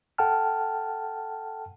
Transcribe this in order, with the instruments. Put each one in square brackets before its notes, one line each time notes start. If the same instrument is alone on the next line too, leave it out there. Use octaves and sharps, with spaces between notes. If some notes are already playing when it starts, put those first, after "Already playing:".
[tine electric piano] A4 F#5 G5 A5 F6